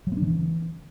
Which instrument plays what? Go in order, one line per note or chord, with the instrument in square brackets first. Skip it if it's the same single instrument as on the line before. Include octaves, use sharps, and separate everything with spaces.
[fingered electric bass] F#3
B3
D4
D#3
E3